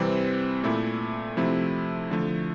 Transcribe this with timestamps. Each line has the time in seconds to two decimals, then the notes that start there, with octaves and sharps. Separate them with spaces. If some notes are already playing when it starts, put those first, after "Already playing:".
Already playing: C3 E3 G3 C4
0.64 A#2 A3 E4
1.37 C3 F3 A3 C4 E4
2.10 D3 F3 A3